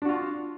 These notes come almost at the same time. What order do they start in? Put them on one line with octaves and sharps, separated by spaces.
D4 F#4 F4